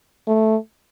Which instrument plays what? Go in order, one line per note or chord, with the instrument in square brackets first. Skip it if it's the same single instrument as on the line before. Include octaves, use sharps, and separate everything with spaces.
[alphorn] A3